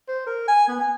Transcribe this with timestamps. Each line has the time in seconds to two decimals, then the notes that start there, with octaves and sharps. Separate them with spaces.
0.08 C5
0.27 A#4
0.48 G#5
0.68 B3
0.80 G#5